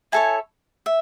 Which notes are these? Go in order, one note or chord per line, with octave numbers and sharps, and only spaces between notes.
E4 A4 C#5 G#5
E5